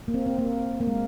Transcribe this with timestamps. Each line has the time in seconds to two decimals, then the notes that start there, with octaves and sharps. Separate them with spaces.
0.08 A#3
0.14 C4
0.26 C4
0.39 A#3
0.81 A#3
0.87 G#3